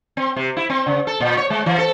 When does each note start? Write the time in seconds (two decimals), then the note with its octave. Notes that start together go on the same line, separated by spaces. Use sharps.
0.17 C4
0.36 C3
0.57 E4
0.70 C4
0.87 C#3
1.07 A4
1.20 A#2
1.37 C#5
1.50 G#3
1.66 E3
1.78 A4